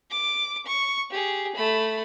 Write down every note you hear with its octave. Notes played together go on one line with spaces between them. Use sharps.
D6
C#6
G4 G#4
A3 B5